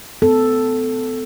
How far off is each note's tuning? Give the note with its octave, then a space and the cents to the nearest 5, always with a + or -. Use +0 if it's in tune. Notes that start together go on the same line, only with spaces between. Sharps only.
B3 +45 A4 +0